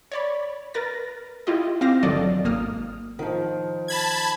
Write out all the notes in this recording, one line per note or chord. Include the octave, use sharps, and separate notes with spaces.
C#5 D5 B5
A#4 B4 A6 A#6
E4 F4 G4 D#5
C4 F5 D6 A#6
G1 D#3 F#3 A4 D5 D#5
G#1 A#3 D#6 F6
D#3 F3
A5 B5 G#6